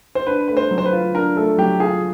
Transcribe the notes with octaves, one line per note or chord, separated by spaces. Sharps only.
C5
D4 B4
A3 B4
C5
F#3
C5
B4
F4
D4 A#4
A3 A4
F#3 G4
F4 G#4